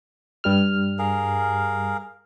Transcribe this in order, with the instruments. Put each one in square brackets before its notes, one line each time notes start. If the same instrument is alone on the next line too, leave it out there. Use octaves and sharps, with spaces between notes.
[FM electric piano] G2 G3 F6
[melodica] G#4 A#4 F5